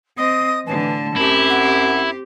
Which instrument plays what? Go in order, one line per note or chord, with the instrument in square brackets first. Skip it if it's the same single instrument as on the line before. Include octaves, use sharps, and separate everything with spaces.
[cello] C4 D#5 [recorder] D#6
[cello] A2 D3 [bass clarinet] E3 [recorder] A5
[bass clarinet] F#2 [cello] C4 G4 [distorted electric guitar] E4
[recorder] F#5